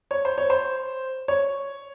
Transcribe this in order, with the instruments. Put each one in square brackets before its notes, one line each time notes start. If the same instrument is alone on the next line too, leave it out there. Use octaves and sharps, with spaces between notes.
[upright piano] C#5
C5
C#5
C5
C#5